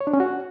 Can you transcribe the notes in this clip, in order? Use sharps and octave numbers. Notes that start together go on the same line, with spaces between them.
C#5
D4
C#4
F#4